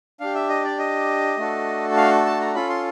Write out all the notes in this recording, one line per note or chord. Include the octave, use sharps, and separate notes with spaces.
D4 G4 F5
E5
D#5
D5
D#5
A3 D4 F#4 A4
F5
A5
A#5
C#4 F4 A4 B5
C6